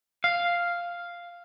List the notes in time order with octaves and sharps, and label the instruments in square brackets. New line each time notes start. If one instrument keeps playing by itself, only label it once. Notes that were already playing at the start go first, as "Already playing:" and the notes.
[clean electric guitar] F5